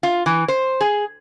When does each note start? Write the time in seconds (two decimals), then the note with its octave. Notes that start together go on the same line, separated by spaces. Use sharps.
0.03 F4
0.26 E3
0.48 C5
0.81 G#4